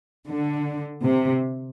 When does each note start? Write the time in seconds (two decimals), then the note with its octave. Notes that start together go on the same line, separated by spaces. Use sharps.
0.26 D3
1.04 C3